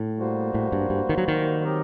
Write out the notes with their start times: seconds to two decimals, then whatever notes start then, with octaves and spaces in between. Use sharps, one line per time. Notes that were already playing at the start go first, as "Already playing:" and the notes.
Already playing: A2
0.18 G3 A#3 F#4 C5
0.54 A2
0.72 G2
0.90 G2
1.09 D#3
1.18 F#3
1.28 D#3
1.64 F#3 C4 G4 A#4 D#5